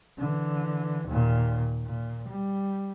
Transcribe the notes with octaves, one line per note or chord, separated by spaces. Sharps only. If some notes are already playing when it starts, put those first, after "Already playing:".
D3 E3
D#2 A#2
A#2
G3